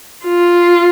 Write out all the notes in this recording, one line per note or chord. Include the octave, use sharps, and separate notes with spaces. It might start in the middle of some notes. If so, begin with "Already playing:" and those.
F4